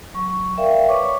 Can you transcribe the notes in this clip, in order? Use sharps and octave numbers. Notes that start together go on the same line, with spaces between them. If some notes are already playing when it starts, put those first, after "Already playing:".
F#3 C#6
A#4 D5 E5 F5 G5
B4 C#5 C#6 D6